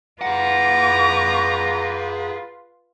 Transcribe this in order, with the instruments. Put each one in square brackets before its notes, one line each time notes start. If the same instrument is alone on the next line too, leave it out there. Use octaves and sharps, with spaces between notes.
[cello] F4 B4 [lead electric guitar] G#4 F#5 [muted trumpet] A#5 [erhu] D6